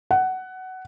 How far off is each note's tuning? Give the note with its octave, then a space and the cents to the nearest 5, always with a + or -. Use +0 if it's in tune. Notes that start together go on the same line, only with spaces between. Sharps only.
F#5 +15